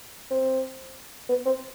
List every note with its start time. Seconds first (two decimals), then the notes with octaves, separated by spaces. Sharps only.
0.31 C4
1.29 B3
1.46 C4